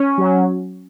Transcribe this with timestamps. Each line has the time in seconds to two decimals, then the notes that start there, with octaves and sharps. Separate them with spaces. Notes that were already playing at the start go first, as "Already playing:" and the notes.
Already playing: C#4
0.18 F#3